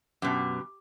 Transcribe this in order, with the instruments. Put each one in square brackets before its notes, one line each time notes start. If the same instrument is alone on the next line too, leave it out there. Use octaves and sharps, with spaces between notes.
[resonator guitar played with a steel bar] F#2 B2 [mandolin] G4